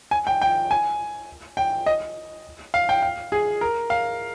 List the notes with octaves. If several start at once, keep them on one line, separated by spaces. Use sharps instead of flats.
G#5
G5
G5
G#5
G5
D#5
F5
G5
F5
G#4
A#4
F5